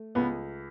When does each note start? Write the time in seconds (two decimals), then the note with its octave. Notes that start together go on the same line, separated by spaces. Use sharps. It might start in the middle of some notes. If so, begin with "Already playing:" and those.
Already playing: A3
0.15 C#2 B3